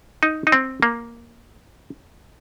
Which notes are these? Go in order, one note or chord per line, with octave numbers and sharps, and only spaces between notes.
D#4
D#4
C4
A#3